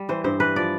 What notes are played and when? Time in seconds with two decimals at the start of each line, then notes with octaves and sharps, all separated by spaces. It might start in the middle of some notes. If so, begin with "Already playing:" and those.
Already playing: G3
0.09 E3 C5
0.24 G2 C5
0.40 E3 B4
0.56 F3 D5